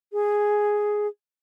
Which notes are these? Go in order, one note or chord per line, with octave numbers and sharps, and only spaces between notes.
G#4